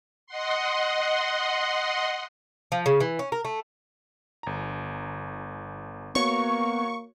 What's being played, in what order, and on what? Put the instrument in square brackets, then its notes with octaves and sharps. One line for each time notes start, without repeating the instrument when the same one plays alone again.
[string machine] D#5 F#5 C6
[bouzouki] F3
C#3
E3
C#4
A#4
A3
[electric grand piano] G1 A#5
[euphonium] A#3 [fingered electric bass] B3 [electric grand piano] F#4 C#5 [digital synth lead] C#6